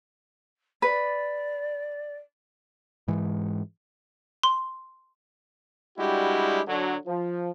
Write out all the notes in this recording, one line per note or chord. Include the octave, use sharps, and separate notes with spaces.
B4 D5
G#2 E3 G#3
C6
G3 G#3 D4 E4 F#4 G4
D3 F#3
F3